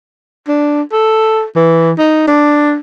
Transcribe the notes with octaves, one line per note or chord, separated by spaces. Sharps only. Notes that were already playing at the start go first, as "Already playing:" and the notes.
D4
A4
E3
D#4
D4